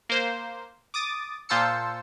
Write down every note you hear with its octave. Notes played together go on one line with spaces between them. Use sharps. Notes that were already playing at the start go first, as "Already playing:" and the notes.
A#3 C5
D6 D#6 A6
A#2 F4 C5 A5 E6 C#7